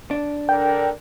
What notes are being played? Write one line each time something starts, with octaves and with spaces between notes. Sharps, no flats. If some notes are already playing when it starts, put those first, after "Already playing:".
D4
D3 A#4 D5 G5